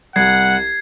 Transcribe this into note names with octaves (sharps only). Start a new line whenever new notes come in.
C2 F#5 G#6 C7